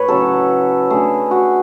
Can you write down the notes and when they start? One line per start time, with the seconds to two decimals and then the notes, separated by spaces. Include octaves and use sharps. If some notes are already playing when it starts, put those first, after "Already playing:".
Already playing: A2 B4 C#5
0.08 C#3 F#3 A3 A4
0.90 D3 A3 G#4
1.31 F#4